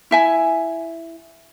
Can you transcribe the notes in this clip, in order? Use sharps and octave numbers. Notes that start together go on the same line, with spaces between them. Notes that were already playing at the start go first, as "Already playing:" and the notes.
E4 E5 G#5